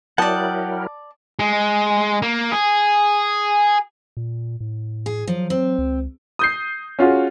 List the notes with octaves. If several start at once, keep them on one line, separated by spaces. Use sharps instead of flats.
F#3 E4 A#4 D5 F#5 G5 A5 D#6
G#3
A#3
G#4
A#2
A2
G#4
F3 F#3
C4
C#2
D#6 G6 C7
C#4 F4 F#4 G#4